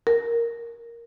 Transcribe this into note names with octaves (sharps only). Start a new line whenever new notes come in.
A#4